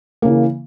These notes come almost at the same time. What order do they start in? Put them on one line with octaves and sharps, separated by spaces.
A#3 C#3 E3